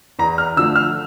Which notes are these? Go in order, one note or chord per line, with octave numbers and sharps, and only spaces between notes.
E2 A#5
F6
D3 F3 A3 E6
F6